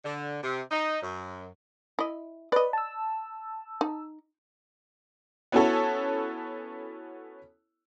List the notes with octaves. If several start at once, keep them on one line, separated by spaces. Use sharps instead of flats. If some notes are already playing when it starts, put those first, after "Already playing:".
D3
C3
D#4
F#2
E4 D#5
B4 D5 D#5
A5 E6
D#4
B3 C#4 E4 F#4 A4 C#5